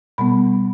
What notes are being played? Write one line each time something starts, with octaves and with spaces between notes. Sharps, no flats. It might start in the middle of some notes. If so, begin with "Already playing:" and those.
B2 G3 B3 B5